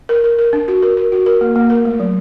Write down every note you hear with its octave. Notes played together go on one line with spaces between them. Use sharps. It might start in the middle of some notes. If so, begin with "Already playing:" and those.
A#4
A#4
A#4
D4
F#4
A#4
A#4
F#4
A#4
A#3
A#3
A#4
A3
F#3